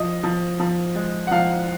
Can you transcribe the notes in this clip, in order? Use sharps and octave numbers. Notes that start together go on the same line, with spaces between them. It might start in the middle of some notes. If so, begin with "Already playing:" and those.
Already playing: F3 D#5
F3
F3
G#3
F#5
F3 F5